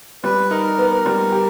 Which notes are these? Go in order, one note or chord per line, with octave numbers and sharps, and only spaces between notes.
G3 B4
D#4 A#4
B3
G3
G4